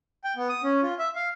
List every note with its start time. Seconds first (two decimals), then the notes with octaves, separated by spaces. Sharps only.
0.24 G5
0.36 B3
0.49 D#6
0.64 C#4
0.83 F4
0.99 E5
1.15 F5